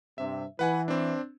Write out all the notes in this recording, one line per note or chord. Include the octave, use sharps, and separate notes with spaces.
G2 C3 E5
E3 B4 F#5 G#5
C4 D4